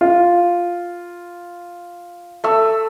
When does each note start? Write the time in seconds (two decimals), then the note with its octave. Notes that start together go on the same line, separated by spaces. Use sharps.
0.01 F4
2.44 A3 E6